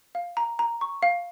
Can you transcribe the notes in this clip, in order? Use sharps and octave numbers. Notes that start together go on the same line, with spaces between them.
F5
A#5
A#5
C#6
F5